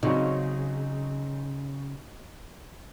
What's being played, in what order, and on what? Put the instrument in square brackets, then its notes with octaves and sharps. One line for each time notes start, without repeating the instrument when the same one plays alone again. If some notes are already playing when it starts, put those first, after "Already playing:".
[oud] C#3 [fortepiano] F#3 C4 D#4